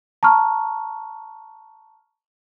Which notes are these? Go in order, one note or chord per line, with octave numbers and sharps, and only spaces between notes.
A5 A#5 C#6 F6